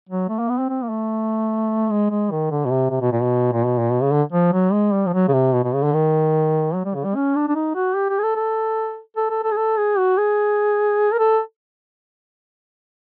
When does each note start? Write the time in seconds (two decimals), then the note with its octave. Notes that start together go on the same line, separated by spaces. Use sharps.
0.09 F#3
0.29 A3
0.39 A#3
0.49 B3
0.58 C4
0.69 C4
0.82 A#3
0.89 A3
1.90 G#3
2.10 G#3
2.31 D#3
2.51 D3
2.65 B2
2.71 C3
2.90 C3
3.01 B2
3.12 A#2
3.22 B2
3.52 A#2
3.65 B2
3.79 A#2
3.92 B2
4.02 C#3
4.12 D3
4.32 F3
4.52 F#3
4.72 G#3
4.93 G3
5.06 F3
5.13 F#3
5.28 C#3
5.33 C3
5.53 B2
5.64 B2
5.74 C#3
5.83 D3
5.94 D#3
6.74 F#3
6.85 G3
6.95 C#3
7.04 G3
7.15 C#4
7.35 D4
7.48 D4
7.55 D#4
7.75 F#4
7.95 G4
8.09 G4
8.18 G#4
8.23 A4
8.36 A4
9.16 A4
9.30 A4
9.43 A4
9.51 G#4
9.56 A4
9.77 G#4
9.98 F#4
10.18 G#4
11.12 A#4
11.18 A4